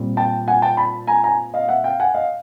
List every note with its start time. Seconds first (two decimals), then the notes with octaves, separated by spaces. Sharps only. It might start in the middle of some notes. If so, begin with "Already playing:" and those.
Already playing: A#2 G3 C4
0.17 G5 A5
0.48 F#5 G#5
0.62 G5 A5
0.77 A5 B5
1.07 G#5 A#5
1.24 G#5 A#5
1.54 D#5 F5
1.69 E5 F#5
1.84 F5 G5
2.00 F#5 G#5
2.14 D#5 F5